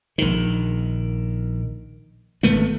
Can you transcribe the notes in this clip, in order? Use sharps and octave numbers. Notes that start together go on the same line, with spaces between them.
A#1 D#3
G#1 A3 B3